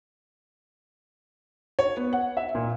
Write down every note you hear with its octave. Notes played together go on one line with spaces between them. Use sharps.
C#5
B3
F#5
E5
A#2